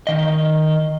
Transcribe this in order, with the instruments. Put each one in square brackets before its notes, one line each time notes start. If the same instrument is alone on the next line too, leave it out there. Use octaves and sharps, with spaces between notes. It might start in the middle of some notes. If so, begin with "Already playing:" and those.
[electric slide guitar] D#3 D#5